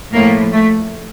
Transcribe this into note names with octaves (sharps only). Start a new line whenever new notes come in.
A2 F3 A#3
A3